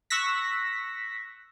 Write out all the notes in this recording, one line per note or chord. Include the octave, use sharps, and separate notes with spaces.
C#6 E6 F#6 A#6 B6